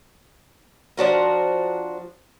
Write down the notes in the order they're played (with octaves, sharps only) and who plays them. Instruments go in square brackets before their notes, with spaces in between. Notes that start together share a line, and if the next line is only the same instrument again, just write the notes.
[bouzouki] F3 D4 F#4 A#4